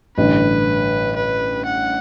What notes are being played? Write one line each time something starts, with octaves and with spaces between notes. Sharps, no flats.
A1 G2 D3 B4
B4
F#5